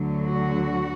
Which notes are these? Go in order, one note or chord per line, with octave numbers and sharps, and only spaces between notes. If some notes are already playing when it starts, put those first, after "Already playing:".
Already playing: D2 D3 F#3
F#4